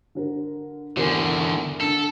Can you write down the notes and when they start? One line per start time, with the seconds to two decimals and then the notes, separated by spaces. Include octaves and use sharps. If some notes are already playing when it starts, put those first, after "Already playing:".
0.15 D3 A#4
0.97 E2 D3 A#4 G#5
1.81 D3 A4